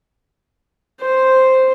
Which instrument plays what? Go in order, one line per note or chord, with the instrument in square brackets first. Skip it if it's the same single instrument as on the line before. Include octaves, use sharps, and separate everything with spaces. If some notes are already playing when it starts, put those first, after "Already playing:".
[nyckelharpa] C5